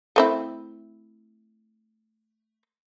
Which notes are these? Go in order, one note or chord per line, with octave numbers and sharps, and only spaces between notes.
A3 C4 E4